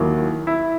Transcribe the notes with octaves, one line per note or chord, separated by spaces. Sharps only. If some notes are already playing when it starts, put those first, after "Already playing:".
Already playing: D#2 D#3 F#3 E4
E4